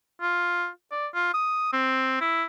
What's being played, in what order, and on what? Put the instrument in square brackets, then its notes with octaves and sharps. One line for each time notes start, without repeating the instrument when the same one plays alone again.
[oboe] F4
D5
F4
D#6
C4
E4